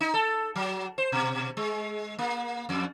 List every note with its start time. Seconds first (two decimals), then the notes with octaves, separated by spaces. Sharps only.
0.01 D#4
0.14 A4
0.56 F#3
0.98 C5
1.12 B2
1.57 G#3
2.19 A#3
2.69 F2